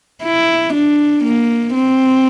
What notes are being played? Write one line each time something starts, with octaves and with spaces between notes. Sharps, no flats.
E4
D4
A#3
C4